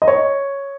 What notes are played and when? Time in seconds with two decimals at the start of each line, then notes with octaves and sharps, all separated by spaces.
0.02 D#5
0.08 C#5